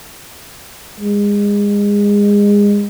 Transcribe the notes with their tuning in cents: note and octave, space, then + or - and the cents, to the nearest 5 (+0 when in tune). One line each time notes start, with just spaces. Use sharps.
G#3 -25